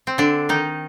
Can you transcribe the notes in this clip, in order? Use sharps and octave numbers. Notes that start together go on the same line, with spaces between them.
C4
D3 D4
D#3 D#4